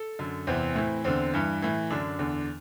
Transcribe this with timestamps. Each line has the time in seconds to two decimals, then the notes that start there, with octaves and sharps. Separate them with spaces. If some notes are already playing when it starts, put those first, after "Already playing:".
Already playing: A4
0.19 F#2 D3
0.47 E2 C3 E3 C4
0.76 A2 E3
1.04 E2 D3 C4
1.34 G2 E3
1.62 A2 E3
1.91 F#2 D3 D4
2.19 E2 D3